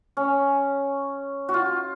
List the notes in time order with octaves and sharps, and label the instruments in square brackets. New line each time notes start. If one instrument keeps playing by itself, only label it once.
[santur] C#4
F#4
F4